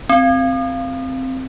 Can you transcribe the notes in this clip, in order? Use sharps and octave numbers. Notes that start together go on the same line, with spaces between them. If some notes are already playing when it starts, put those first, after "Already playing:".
C4